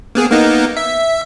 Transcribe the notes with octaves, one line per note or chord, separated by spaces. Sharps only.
A#3 B3 G#4
A#3 B3 D#4
E5